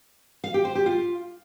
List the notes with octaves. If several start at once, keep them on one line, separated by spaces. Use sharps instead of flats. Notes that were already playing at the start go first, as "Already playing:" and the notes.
F5
G4
C5
G4
F4